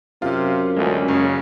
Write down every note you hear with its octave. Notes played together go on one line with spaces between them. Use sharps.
F#2 C3 F4
D2 G#3 C#4
F#1 C#3